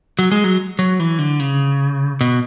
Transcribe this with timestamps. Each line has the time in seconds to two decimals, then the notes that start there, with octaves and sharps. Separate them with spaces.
0.19 F#3
0.32 G#3
0.44 F#3
0.79 F#3
0.99 E3
1.19 D3
1.40 C#3
2.21 B2